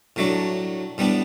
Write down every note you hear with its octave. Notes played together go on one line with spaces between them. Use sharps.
A2 F#3 A3 D4
A2 G3 B3 D4